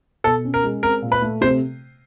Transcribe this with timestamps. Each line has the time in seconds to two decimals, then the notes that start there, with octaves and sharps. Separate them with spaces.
0.24 B2 A4
0.44 C#4
0.54 A#4
0.64 G#3
0.83 C4 A#4
1.02 A#2
1.12 B4
1.22 A3
1.41 C3 C5